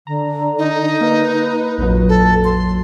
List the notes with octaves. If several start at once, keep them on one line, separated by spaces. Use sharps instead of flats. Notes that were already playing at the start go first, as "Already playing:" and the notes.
D3 A#5
D#4
A#3 B4
A#1 F2 F#3
A4
C6